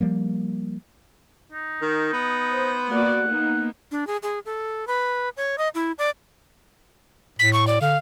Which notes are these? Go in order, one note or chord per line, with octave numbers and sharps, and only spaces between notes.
F3 G3 A#3
D#4
D#3
B3
C5
A#3 F#4 D5 F#5
A#3 B3 D#4
D4
G#4
G#4
A4
B4
C#5
D#5
E4
D5
A2 B6
C#6
D5
D3 F5